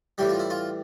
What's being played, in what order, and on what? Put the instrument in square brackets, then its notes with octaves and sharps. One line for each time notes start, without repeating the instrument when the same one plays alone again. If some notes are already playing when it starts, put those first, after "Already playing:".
[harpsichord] A2 E3 G3 G4
F4
E4
F4